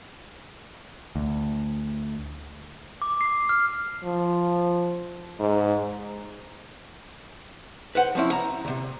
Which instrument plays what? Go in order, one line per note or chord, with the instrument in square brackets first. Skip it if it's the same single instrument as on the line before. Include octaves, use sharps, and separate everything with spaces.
[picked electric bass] D2
[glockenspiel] D6
C7
F6
[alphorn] F3
G#2
[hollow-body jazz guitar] B4 C5 F#5
F3 C4 C#4 E4
A#5
D2 C3